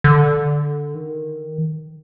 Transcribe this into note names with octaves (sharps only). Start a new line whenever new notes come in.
D3
D#3